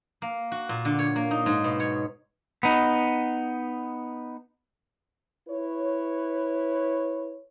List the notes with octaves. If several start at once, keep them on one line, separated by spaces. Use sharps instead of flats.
A#3
F#4
A#2
D3
C#5
A#3
D#4
G#2
B2
C#5
B3 D#4
E4 B4 C#5